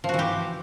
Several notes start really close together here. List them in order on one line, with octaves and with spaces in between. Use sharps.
F3 F#4 E3 G4